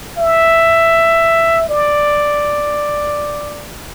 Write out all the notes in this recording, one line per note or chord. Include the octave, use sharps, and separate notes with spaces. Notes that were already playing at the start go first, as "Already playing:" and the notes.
E5
D5